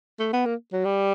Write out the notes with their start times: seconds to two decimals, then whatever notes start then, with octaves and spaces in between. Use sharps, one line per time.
0.19 A3
0.33 B3
0.45 A#3
0.73 F#3
0.85 G3